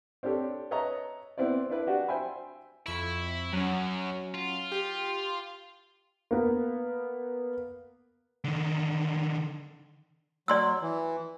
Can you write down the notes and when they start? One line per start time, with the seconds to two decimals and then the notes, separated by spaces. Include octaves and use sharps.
0.23 C4 D4 G4 A4 C#5
0.71 B4 C#5 D#5 E5 A5 A#5
1.38 B3 C4 E4 C5 D5
1.70 D4 E4 B4 D5
1.87 D4 F#4 G4
2.08 C5 E5 G5 G#5 B5
2.86 F2 E4 C#6
3.53 F#2 F#3 C#4
4.34 F4
4.72 G4
6.31 A#3 B3
8.44 D3 D#3
10.48 F#3 D5 C6 E6
10.82 E3